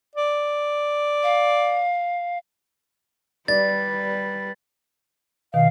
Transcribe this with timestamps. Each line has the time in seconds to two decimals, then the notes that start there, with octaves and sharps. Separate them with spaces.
0.15 D5
1.23 F5
3.48 G3 B4 D5 A6
5.54 B2 D#3 F5